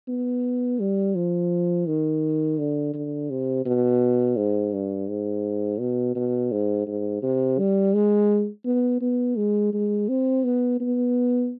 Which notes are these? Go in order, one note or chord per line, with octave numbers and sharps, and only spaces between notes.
B3
G3
F3
D#3
D3
D3
C3
B2
G#2
G2
G#2
B2
B2
G#2
G#2
C3
G3
G#3
B3
B3
G#3
G#3
C4
B3
B3